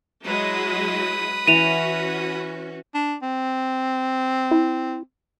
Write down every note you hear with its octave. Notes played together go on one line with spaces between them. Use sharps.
F#3 G#3 E4 B4 D#6
E3 C#4 F#4 D#7 F7
D4
C4
E4